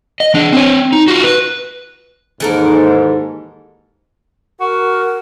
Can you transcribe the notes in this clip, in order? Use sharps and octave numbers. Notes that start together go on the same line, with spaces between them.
D#5
E3 D4
C4 C#5
D#4
F4 F#4
B4
D#2 G#2 E3 A4 A#4
F#4 A#4